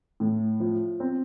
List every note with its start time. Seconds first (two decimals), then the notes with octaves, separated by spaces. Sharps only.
0.20 A2
0.60 F3
1.00 C4